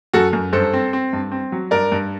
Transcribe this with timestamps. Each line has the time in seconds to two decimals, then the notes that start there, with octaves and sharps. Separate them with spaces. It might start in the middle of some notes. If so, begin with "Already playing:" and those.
0.13 F#2 F#4 A4
0.33 F#2
0.53 G2 A4 C5
0.73 C4
0.93 C4
1.13 G2
1.32 C4
1.52 F#3
1.71 G2 A#4 D5
1.92 G2